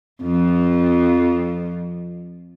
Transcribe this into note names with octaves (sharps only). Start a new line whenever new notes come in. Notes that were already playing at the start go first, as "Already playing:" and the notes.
F2 F3